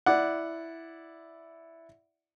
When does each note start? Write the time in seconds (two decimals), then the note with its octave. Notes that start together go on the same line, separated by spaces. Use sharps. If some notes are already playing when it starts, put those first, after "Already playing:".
0.06 E4 D5 F#5